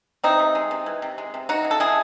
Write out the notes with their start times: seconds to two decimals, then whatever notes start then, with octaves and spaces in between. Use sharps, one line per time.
0.24 E3 C4 D#4
0.39 C3
0.55 G#3
0.71 C3
0.86 E3
1.02 C3
1.18 G#3
1.34 C3
1.49 E3 D#4 F#4
1.64 C#3
1.71 A4
1.80 G#3 E4 G#4